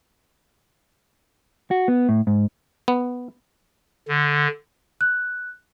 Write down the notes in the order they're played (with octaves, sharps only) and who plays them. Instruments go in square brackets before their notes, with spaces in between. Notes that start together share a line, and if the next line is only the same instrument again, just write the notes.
[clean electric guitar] F#4
B3
A2
G#2
[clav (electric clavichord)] B3
[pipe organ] D3
[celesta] F#6